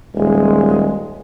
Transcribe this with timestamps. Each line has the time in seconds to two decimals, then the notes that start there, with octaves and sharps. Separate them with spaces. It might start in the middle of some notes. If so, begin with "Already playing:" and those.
0.14 D#1 G#3